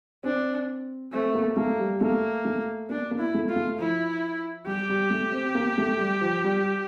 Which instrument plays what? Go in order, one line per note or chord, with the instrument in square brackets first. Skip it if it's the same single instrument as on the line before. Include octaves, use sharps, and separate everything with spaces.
[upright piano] C4 [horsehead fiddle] D4
[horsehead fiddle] A3 [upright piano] C4
[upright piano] A#3
[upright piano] A3 [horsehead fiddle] A#3
[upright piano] G3
[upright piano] A3 [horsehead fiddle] A#3
[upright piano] A3
[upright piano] A#3 [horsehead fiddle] D4
[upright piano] A#3
[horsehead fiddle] E4
[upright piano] A3
[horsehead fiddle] F4
[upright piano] A3
[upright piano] F3 [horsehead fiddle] E4
[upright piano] G3 [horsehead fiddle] G4
[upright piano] G3
A3
C4
A#3
A3
G3
F3
G3